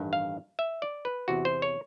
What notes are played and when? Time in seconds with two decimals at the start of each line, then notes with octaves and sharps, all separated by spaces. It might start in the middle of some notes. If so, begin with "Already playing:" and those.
Already playing: A1 G2 D#3
0.13 F5
0.59 E5
0.82 D5
1.05 B4
1.28 E2 C3 E3 F#4
1.45 C5
1.62 C#5